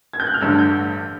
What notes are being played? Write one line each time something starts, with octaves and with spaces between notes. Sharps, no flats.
G#6
G6
F#6
F6
A1 G2 D3 E6
G6